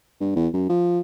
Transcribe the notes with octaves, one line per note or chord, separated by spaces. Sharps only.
G2
E2
F#2
F3